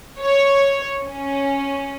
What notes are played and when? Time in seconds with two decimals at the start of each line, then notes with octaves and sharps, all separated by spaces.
0.20 C#5
1.06 C#4